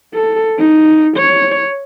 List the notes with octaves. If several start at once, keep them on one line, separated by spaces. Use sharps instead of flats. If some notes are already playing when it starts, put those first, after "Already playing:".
A4
D#4
C#5